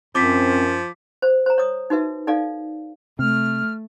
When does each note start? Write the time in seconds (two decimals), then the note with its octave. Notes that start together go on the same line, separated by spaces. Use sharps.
0.15 F#2 F3 C4 D6 B6
1.22 C5
1.46 C5 A#5
1.58 C#5 D#6
1.90 D#4 F#4 B4 E5
2.27 D#4 A4 D5 F5
3.19 C3 A3 F6